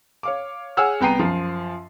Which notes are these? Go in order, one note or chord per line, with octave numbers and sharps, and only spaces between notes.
C#5 F5 D6
G#4 C#5 F#5 G#5 E6 F6
C2 B3 G5 A#5 C7 D#7
F#2 F3